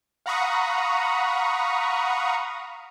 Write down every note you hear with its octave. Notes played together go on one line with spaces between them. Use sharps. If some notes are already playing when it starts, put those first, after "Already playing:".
F5 F#5 A#5 B5 C#6 D#6